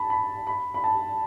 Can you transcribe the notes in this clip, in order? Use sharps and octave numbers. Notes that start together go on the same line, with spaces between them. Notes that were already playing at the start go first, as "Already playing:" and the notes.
Already playing: A5 B5
B5
B5
B5
A5